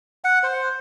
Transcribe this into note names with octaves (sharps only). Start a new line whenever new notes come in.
F#5
C5